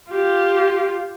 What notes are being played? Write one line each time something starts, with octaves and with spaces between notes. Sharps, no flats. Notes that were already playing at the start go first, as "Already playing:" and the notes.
F4 G4